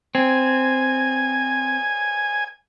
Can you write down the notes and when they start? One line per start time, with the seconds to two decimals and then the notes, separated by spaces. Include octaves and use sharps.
0.15 C4 G#5